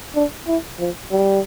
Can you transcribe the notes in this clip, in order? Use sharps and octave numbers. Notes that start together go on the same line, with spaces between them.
D4
E4
F3
G3